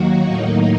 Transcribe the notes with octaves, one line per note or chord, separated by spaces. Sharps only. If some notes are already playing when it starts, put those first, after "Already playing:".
Already playing: D#2 D#3 F#3 A#3 F#4
A2 F#3 A#3 D#4